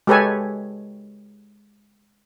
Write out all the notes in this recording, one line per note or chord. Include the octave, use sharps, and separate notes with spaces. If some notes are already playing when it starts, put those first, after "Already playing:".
G#3 G4 A4 B4 C#5 G#5